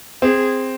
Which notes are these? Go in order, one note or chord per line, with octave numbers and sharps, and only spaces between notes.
C4 G#4